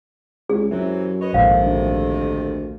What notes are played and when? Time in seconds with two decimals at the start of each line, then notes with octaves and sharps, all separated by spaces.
0.50 C#2 G#4
0.71 F#2 C3 E3 F#3
1.21 B4 C#5 D#5
1.34 A#1 F2 G#2 C3 D#3 F5
1.63 D2